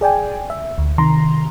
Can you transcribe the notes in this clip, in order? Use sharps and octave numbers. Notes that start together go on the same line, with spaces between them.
G#4 D5 G5 G#5
E5
D2
C3 D#3 A#5 C6